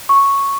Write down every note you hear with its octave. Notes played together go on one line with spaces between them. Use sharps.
C#6